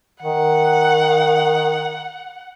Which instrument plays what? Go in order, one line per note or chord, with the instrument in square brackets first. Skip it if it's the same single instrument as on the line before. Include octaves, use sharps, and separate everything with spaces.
[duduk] D#3 [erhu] F#5